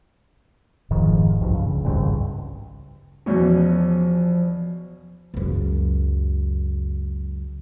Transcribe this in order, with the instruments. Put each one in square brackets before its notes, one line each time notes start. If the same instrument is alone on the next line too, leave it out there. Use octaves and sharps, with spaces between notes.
[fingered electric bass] F1 G#2 D#3 F3
B1 G2 F3
C#2
G#1 C#2 G2
[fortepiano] E2 B2 C#4 [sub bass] F3
[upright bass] C#2 F#2